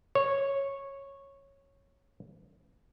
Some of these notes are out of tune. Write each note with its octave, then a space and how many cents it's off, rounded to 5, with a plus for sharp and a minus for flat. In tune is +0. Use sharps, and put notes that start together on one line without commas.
C#5 -10